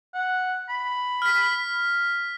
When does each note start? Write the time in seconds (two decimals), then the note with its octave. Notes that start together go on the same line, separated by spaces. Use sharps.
0.14 F#5
0.69 B5
1.22 F6 B6